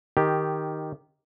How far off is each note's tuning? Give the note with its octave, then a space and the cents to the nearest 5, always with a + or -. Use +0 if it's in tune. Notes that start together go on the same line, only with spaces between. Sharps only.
D#3 +0 G4 +0